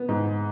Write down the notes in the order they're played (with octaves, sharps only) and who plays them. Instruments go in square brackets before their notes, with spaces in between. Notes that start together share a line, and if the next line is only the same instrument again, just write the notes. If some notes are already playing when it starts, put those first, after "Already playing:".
Already playing: [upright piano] B3
G#2